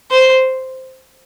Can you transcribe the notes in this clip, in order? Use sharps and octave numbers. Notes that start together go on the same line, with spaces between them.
C5